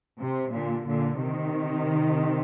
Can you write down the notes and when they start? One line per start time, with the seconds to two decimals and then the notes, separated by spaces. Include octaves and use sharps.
0.19 C3
0.53 A#2 D3
0.87 A#2 D3
1.21 C3 D#3